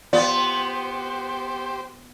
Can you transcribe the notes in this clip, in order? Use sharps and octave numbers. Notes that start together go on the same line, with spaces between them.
B3 F4 G4 C5 D5